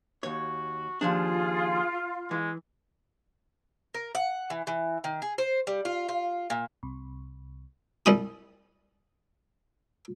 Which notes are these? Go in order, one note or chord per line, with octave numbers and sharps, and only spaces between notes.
D#2 F#4 C#5
D#2 F3 D4 F4 G#4
E3 G#3
A#4
F#5
E3
E3
D#3
G#4
C5
G3
F4
F4
A#2
C2
C2 G3 D#6